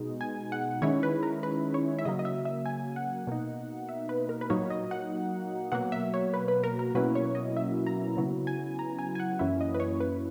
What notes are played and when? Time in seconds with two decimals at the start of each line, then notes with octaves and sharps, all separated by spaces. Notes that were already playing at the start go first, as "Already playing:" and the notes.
Already playing: B2 G#3 D#4
0.21 G#5
0.52 F#5
0.82 D#3 G#3 C#4 E4 C#5
1.03 B4
1.23 A#4
1.43 B4
1.74 C#5
1.99 E5
2.05 C#3 F#3 A#3 D#5
2.19 D#5
2.25 E5
2.45 E5
2.66 G#5
2.96 F#5
3.27 B2 A#3 D#4
3.89 E5
4.09 B4
4.29 A#4
4.41 B4
4.50 A#2 F#3 A#3 D#4 C#5
4.70 D#5
4.91 F#5
5.72 B2 F#3 A#3 F#5
5.92 E5
6.14 C#5
6.34 B4
6.48 B4
6.64 A#4
6.79 A#4
6.95 B2 F#3 A#3 C#4 E4 B4
7.15 C#5
7.35 D#5
7.56 E5
7.86 A#5
8.17 C#3 F#3 B3 E4
8.47 G#5
8.79 A#5
8.99 G#5
9.15 G#5
9.19 F#5
9.39 F#2 E3 A#3 C#4 E4 E5
9.61 D#5
9.74 B4
9.80 C#5
10.00 B4